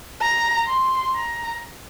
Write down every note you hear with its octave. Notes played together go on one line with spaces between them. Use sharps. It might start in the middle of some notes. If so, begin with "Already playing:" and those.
A#5
C6
A#5